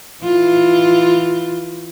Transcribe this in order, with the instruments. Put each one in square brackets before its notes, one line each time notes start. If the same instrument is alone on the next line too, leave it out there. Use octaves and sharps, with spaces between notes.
[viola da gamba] E3 F4